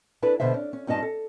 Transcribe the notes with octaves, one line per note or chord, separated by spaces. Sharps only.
D4 E4 A4 B4
B2 D3 C5 E5
C#4 D4
C#4
G2 C#4 D#4 D#5 A5
A4